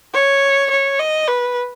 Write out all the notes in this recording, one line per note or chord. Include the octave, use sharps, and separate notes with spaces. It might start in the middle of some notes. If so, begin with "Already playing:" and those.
C#5
C#5
D#5
B4